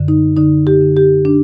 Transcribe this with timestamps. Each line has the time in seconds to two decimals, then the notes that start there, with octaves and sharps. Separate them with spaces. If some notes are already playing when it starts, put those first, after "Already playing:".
Already playing: F#2 D3
0.08 D#4
0.37 D3 D#4
0.67 G4
0.81 D3
0.97 G4
1.25 D4